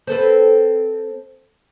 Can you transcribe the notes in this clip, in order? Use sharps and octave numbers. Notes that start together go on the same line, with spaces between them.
C4 A4 B4